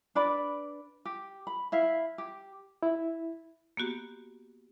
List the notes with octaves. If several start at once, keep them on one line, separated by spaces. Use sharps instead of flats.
D4 B4 D5 B5
G4
B5
E4 E5 F5
G4
E4
A#3 B3 F#4 G4